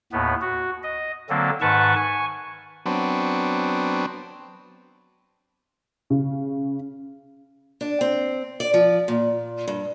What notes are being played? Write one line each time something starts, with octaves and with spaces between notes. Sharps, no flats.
D#2 A2 B3
F#4
D#5
D3 F#3 A#3 C4 A4
G#2 D#3 B4 F#5 A5 C#6
G#5 C#6
F#3 B3 C4 D4
C#3
D4
C4
D5
F3
A#2
G2